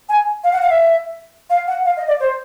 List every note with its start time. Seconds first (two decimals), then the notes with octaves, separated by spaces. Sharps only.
0.09 G#5
0.44 F5
0.53 F#5
0.62 F5
0.70 E5
1.50 F5
1.67 F#5
1.85 F5
1.97 D#5
2.08 D5
2.20 C5